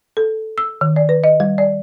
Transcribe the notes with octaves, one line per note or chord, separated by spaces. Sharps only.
A4
E6
D#3
D5
B4
D#5
G3
D5